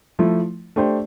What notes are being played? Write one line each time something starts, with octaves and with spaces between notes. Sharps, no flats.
F3 A3 E4
A3 D4 G4 C5